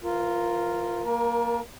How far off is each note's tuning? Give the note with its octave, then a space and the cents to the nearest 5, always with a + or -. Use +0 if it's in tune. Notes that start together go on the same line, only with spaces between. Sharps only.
E3 +35 F4 +0 A#4 -5
A#3 +5 A#4 +30 A5 +0